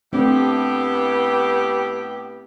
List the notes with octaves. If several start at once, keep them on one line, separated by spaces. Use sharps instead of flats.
A2 A3 B3 C4 D4 G4